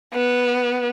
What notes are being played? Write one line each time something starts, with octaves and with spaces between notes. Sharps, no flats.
B3